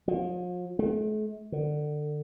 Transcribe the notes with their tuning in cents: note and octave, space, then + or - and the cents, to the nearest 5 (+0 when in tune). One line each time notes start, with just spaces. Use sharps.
F3 +40
A3 -45
D3 +25